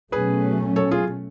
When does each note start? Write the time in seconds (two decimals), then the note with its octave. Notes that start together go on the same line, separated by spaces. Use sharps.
0.12 B2 F#3 A3 C#4 G#4 B4
0.76 A4 C#5
0.91 F4 G#4